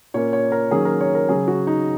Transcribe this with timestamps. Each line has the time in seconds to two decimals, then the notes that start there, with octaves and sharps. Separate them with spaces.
0.14 A#2 A#3 C#4 C#5
0.33 C#5
0.52 A#4
0.71 D#3 F#3 A#3 C#4 G#4
0.85 A#4
1.01 C#5
1.15 A#4
1.29 C#3 F#3 C#4 G#4
1.48 F#4
1.67 D#4